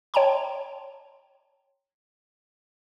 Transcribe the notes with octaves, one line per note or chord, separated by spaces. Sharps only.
C#5 G5 A5 A#5 C6